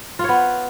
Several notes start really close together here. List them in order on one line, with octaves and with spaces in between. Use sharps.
F4 C#5 B3